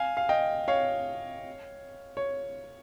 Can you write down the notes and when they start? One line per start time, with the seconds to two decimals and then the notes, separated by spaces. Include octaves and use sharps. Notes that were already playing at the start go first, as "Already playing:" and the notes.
Already playing: F5 G#5
0.17 F5
0.29 D#5 G5
0.68 C#5 F5
2.17 C#5